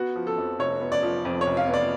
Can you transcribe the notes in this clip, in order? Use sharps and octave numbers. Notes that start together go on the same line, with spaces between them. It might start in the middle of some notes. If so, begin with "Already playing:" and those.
Already playing: B3 F#4
F3
A4
F2
F1 C#5
B3
D5
F3
F2
C#5
F1
F5
B3
D5